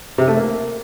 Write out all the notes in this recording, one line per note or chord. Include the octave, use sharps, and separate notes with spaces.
C3
A3
A#3